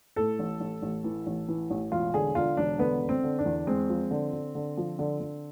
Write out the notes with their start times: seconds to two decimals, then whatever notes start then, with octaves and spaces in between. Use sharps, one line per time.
0.16 A2 A4
0.39 A1
0.60 A1
0.82 A1
1.04 E3
1.26 A1
1.49 E3
1.70 A1
1.91 E1 F4
2.14 D3 G#4
2.35 D3 F4
2.57 E1 D4
2.79 D3 B3
3.02 D3
3.09 C4
3.24 D3
3.39 D4
3.46 E2
3.67 G#3 C4
3.89 F3
4.11 D3
4.33 D3
4.55 D3
4.77 F3
4.99 D3
5.20 D3